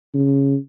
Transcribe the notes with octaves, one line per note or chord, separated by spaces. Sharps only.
C#3